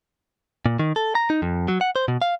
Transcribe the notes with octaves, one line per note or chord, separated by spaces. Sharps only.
A#2
D#3
A4
A#5
D#4
F2
F#3
F#5
C5
B2
F5